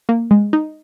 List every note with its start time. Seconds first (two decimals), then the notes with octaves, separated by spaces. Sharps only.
0.09 A#3
0.31 G#3
0.53 D#4